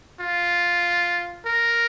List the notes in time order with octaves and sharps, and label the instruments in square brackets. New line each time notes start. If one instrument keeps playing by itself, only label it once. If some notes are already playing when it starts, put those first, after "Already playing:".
[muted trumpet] F4
A#4